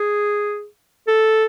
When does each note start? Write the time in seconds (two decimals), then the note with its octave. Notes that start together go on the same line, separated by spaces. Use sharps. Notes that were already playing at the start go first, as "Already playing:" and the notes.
Already playing: G#4
1.07 A4